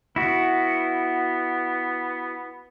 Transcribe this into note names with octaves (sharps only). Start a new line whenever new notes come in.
B3 E4 F#4